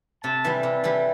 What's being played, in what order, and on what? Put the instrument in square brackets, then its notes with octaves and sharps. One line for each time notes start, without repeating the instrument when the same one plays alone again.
[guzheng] C3 [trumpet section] A5
[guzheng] E3 G3
C3
E3 G3